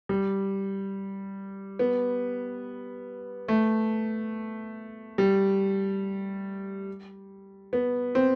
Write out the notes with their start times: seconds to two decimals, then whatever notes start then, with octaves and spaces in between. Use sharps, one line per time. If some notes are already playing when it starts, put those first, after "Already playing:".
0.09 G3
1.79 B3
3.48 A3
5.18 G3
7.73 B3
8.15 C4